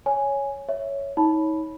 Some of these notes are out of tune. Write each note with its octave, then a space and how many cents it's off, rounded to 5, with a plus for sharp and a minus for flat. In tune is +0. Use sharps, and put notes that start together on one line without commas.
C#5 +0 G#5 +0
C#5 +0 E5 +0
D#4 +35 C#5 +0 B5 -10